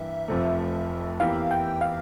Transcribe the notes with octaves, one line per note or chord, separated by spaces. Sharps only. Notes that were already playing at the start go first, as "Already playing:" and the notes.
Already playing: G2 E3 G3 A#3 E5
F1 F2 C3 F3 A3
E2 E3 A#3 E4 G4 F5
G5
F5